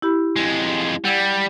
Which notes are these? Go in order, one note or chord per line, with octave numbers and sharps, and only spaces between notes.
E4 G4 B5
F2 G#3
G3 F#5 E6 G#6